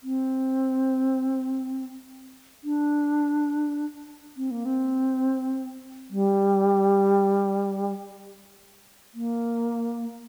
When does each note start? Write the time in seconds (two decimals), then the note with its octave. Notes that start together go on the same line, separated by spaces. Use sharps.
0.03 C4
2.64 D4
4.37 C4
4.51 A#3
4.65 C4
6.10 G3
9.14 A#3